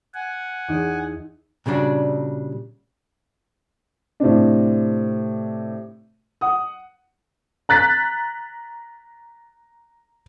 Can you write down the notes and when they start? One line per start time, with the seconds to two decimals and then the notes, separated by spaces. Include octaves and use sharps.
0.14 F#5 G#5
0.68 E2 D#4 D7
1.66 A#2 C#3 G3 D4 F#4
4.20 A2 C3 C4 D4
6.41 F#5 D#6
7.69 A#5 F#6 A6 B6